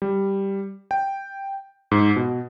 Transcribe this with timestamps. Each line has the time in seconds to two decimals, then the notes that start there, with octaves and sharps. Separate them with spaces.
0.02 G3
0.91 G5
1.91 G#2
2.16 B2